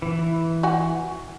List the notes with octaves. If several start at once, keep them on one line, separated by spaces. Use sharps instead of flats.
E3
F#4 F#5 G#5